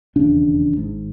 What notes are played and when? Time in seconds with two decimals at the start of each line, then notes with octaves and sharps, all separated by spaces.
0.16 E1 D#2 C#3 D4
0.77 G#1 G#2